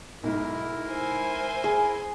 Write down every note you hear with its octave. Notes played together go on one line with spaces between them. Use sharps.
B1 G#2 E4 A#4
C5 G#5
G#4